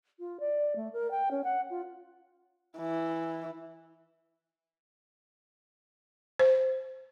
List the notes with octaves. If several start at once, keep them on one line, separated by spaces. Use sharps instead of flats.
F4
D5
A3
A#4
G5
C#4
F#5
F4
E3
C5